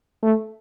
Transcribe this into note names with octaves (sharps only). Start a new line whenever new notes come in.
A3